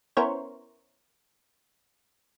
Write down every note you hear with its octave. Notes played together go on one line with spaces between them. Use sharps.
B3 C#4 E4 A#4 C5 C#5